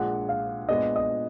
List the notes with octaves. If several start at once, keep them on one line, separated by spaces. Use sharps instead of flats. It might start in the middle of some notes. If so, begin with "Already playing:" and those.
Already playing: A#1 A#2 G#3 D4 G#4 F#5
F5
A#2 G#3 B3 D4 D#5
D#5